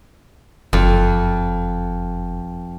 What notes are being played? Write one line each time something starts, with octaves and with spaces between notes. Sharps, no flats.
F#1 F2